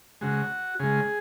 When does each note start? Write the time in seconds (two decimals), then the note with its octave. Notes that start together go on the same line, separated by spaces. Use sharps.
0.21 C#3 G#3 F#4
0.80 C#3 G#3 G#4